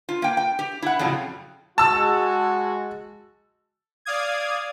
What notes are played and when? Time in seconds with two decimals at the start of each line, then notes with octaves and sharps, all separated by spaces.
0.09 F4
0.22 A#3 G5
0.37 G5
0.59 G4
0.82 E4 F#5
0.99 F2 A2 C#3 F#3
1.78 G#3 F#4 A5 E6
4.05 D5 F5 D#6 G#6